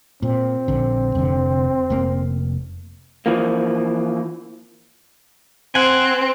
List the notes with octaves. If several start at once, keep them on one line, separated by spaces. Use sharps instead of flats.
A#2 C4
A#1 D3
F1 D3
F1 A#3
E3 F3 A#3
C4 F#5 G#5